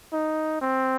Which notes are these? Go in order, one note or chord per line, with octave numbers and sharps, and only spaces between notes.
D#4
C4